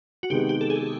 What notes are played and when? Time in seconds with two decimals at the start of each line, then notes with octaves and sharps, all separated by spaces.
0.23 F#4
0.30 C3 D#3 G#3 B3 D#4 G4
0.49 G4
0.61 A4
0.70 G#4